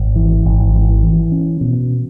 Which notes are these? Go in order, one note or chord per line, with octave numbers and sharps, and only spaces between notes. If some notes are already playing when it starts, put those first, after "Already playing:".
Already playing: G#1
E3
G#1
E3
E3
C#4
B2